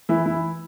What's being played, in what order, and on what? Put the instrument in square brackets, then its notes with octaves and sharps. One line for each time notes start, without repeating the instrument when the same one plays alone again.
[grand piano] E3 E4
E3 E4